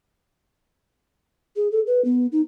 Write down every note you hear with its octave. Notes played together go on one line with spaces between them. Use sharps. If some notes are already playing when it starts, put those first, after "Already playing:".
G#4
A4
B4
B3
D#4